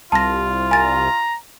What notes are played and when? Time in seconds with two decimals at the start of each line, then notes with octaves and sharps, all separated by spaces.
0.12 C2 F4 A5 A#6
0.71 G#5 A#5 A6